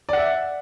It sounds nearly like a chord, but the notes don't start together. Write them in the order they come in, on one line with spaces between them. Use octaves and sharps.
D5 F#5 E5